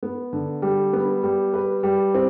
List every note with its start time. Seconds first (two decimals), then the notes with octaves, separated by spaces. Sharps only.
0.03 B3
0.33 D3
0.62 G3
0.93 B3
1.23 G3
1.53 B4
1.83 G3
2.14 C4